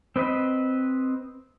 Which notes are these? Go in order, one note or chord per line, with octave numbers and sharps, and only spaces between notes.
C4 B4 D#5 B5